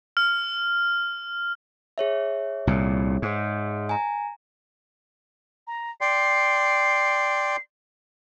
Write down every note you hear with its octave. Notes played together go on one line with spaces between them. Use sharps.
F6
G#4 C#5 E5
C2 A#2
G#2
G#5 A#5
A#5
D5 G5 C6 C7